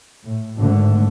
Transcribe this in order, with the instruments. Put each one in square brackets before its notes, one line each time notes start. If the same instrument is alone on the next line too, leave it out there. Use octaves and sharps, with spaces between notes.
[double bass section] A2
G#1 D3 A3